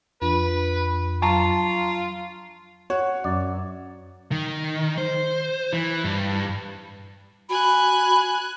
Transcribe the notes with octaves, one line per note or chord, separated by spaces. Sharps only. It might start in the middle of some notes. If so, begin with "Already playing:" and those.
F2 F3 D4 F4 B4
F#3 F4 A5 A#5 C#6
F#4 C#5
F#2 D5
D#3
C5
E3
G2
F#4 G#5 B5 F#6